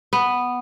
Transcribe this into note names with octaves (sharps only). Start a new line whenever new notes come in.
B3